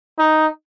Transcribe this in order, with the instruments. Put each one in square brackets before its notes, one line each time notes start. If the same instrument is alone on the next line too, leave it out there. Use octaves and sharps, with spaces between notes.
[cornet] D#4